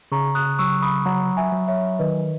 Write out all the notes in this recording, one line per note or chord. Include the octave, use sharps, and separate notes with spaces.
C#3 A#5 C#6
D#6 F#6
F#3 C#6 E6
B5 D#6
F#3 F#5 A#5
E5 G#5
F#3
C#5 E5
D#3 B4 D#5